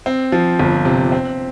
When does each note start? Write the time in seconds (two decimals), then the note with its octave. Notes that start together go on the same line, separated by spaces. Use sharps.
0.06 C4
0.32 F3
0.60 G1
0.85 C3
1.12 C4